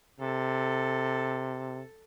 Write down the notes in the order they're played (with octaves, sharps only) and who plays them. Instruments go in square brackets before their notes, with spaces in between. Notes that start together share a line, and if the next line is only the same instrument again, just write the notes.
[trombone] C3 [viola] A4